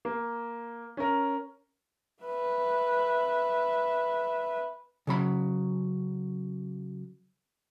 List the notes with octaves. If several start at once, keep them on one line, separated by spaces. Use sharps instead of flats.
A#3
C#4 A#4
B4 E5
C#3 F#3 B5